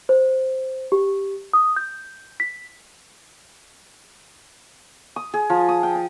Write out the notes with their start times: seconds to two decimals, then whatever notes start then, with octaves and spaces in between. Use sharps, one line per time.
0.09 C5
0.92 G4
1.53 D#6
1.76 G6
2.40 B6
5.16 D#6
5.34 G#4
5.50 F3
5.69 D#6
5.83 G5
5.95 A5